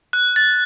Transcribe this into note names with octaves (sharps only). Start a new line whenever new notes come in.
F#6
A6